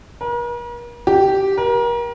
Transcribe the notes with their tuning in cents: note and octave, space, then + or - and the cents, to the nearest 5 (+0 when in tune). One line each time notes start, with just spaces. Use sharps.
A#4 +45
G4 -10
A#4 +30